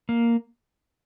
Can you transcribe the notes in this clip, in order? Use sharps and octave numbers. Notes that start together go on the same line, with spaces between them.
A#3